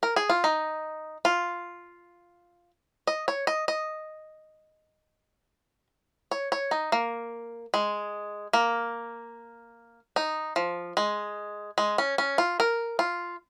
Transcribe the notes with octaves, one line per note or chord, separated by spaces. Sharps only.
A#4
G#4
F4
D#4
F4
D#5
C#5
D#5
D#5
C#5
C#5
D#4
A#3
G#3
A#3
D#4
F3
G#3
G#3
C#4
C#4
F4
A#4
F4